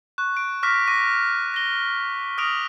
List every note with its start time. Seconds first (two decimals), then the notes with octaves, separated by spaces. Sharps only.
0.18 C#6 F#6
0.37 D7
0.63 C#6 D6 F6 A#6 B6
0.87 C#6 D6 A#6 D#7
1.54 A#6 G7
2.38 D6 D#6 F6 A#6 D7 F7